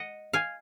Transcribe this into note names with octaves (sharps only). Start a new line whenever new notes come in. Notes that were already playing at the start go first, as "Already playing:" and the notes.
Already playing: D#5 F#5
F5 G#5